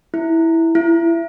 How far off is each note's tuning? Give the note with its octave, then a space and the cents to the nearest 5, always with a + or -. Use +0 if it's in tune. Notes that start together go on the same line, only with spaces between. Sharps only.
E4 -5
E4 +25